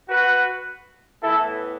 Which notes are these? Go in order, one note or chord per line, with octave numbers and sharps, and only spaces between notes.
F#4 B4
A2 E3 B3 E4 A4